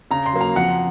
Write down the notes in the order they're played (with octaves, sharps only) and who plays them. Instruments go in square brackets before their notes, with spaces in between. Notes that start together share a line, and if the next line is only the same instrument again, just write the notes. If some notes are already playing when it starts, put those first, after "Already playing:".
[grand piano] C#3 A#5
C6
F#3 A#3
A#5
F2 F#5